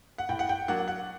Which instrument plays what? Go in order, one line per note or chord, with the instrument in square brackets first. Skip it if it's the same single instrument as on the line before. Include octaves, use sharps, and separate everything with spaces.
[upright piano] F#5
A2 G5
F#5
G5
F#3 A#3 D4 F#5
F#5